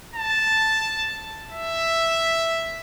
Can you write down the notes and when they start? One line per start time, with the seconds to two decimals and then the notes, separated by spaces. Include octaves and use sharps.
0.15 A5
1.52 E5